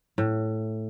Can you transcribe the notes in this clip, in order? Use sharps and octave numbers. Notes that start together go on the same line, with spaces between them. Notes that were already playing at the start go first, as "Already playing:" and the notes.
A2